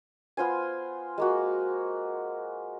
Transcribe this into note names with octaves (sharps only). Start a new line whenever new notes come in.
B3 F4 C5 G#5
G#3 A#3 F#4